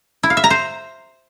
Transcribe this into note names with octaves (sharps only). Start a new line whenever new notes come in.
E4
F5
E5
A#5
C5